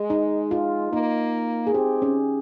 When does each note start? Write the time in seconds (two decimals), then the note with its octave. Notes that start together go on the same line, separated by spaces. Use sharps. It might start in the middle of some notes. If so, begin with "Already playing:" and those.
Already playing: G#3
0.10 D#4
0.51 F4
0.92 A#3 D#4
1.67 G#4
1.74 C4 G4
2.02 C#4